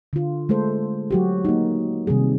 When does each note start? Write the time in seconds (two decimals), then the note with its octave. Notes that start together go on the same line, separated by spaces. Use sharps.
0.13 D3 F4
0.49 G#3 A3 A4 C5
1.11 F#3 F#4 G4
1.45 A#3 D#4
2.07 C3 D#3 G3 G#4